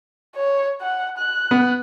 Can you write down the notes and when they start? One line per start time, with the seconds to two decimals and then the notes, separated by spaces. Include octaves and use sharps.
0.36 C#5
0.81 F#5
1.18 F#6
1.51 B3